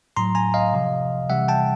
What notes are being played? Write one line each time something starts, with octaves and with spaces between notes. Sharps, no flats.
A2 F#3 A#5 C6
G#5 A#5
D#5 F5
C3 F3
C3 E3 G3 E5 F#5
G5 A5